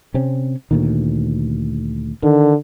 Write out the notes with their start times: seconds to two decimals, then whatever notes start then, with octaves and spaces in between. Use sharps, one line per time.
0.14 C3 C4 C#4
0.71 D2 A#2 D#3
2.23 D3 D#3